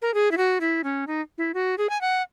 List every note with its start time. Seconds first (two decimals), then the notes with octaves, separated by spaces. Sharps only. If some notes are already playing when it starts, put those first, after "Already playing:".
0.02 A#4
0.14 G#4
0.31 E4
0.37 F#4
0.61 E4
0.84 C#4
1.07 D#4
1.38 E4
1.54 F#4
1.78 G#4
1.90 G#5
2.01 F#5